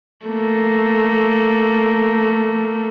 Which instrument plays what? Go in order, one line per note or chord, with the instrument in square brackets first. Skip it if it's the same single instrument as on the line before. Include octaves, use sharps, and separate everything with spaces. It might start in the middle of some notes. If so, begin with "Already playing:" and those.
[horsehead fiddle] A3 A#3